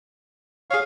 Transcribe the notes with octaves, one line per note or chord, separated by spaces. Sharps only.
G#4 C#5 F5